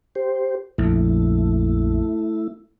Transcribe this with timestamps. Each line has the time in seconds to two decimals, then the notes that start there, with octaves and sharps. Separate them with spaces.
0.15 G4 C5
0.78 A#1 F2 A3 E4